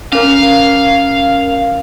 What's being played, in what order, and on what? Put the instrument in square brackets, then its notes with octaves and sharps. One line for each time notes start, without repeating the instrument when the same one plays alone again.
[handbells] C#4 A#4 [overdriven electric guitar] F5